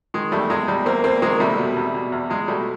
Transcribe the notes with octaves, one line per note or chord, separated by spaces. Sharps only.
D#3 G#3
E2 G3 A3
E2 G#3
E2 G3
E2 A#3 C4
E2 A#3 C4
D#3 G#3 A#3
C3 G3 A3
B2
E2
B2
E2
E2 G#3
B2 G3 A3